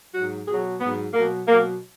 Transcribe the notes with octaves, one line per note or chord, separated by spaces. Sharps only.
G#2 F#3 F#4
B2 F#3 G#4
G#2 F#3 B3
B2 F#3 A#3
B2 F#3 A#3